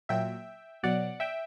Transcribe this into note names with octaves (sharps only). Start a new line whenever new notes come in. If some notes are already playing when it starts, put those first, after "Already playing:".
A#2 F#3 E5 G5
B2 F#3 D5 F#5
E5 G5